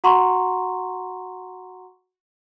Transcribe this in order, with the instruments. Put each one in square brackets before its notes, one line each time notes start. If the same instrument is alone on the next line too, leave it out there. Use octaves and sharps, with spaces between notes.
[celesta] F#4 F#5 A#5 C6 C#6